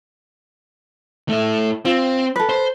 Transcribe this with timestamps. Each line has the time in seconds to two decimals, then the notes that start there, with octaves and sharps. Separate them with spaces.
1.29 A3 E4
1.85 C4 F4
2.36 A4 B4
2.49 C5